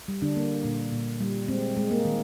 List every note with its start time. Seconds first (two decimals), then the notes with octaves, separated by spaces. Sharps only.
0.08 G3
0.22 D3 D4
0.36 A#3
0.64 A#2
0.92 A#2
1.21 G3
1.48 G#3 C4
1.77 G#3
1.91 A#3
2.05 D#3